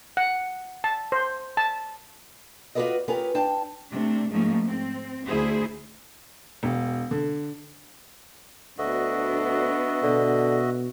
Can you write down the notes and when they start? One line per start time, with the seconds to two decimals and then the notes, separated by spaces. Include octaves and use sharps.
0.17 F#5
0.84 A5
1.12 C5
1.57 A5
2.75 F4 F#4 A4 B4 D5 D#5
3.08 C#4 F4 G4 G#4 A#4 B4
3.35 D4 G5 A5
3.91 C3 A3 D4
4.29 G#2 F3 A3 A#3 C#4
4.65 C4
5.25 D2 E4 G#4 C5
6.63 E1
7.11 D3
8.78 D2 B3 D4 F#4 D#5 E5
10.03 B2 D3